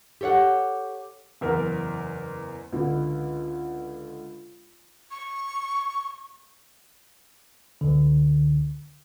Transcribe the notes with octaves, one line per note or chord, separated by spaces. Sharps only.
G4 A4 C#5 F5 F#5
F#1 E2 A#4
C#2 D3
C#6
C#2 D3